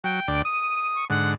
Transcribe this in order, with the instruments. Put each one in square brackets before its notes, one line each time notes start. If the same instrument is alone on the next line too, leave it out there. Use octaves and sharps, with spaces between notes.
[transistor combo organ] F#3 [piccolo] G5
[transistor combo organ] D2 D5
[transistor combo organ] D#6 [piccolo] D#7
[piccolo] C#6
[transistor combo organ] G#2 D3 [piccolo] F#5